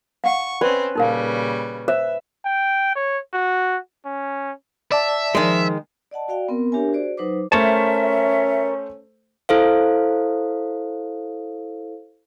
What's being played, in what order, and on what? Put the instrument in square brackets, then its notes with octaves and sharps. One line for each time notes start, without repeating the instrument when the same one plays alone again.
[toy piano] F5 F#5 [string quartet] C#6
[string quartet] C4 C#4 [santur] B4 [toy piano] D5 B5 C#6
[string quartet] A#2 C#3 G3 [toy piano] D#4 A#4 F5
[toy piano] C5 [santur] E5
[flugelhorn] G5
C#5
F#4
C#4
[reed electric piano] D5 A5 [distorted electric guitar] E5
[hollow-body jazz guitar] D#3 G#3 [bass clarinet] F3
[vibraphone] D5 D#5 F#5 A5
F#4 D5 F5 G5
B3 C4 A#4
D4 G4 A#4 C#5 E5 G#5
F#4 G#4 C5 D5
F#3 D#4 B4 C5 D6
[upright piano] A3 C5 [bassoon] C#4 [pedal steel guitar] A#4 C#5 A5 [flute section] E5
[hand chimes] E4 A4 C5 F5